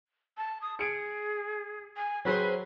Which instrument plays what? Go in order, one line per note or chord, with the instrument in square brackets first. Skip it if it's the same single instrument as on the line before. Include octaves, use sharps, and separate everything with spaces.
[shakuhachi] A5
D#6
[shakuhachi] G#4 [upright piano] C#7 D7
[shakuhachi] G#5
[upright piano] F#3 [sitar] C4 G#4 C5 [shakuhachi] B4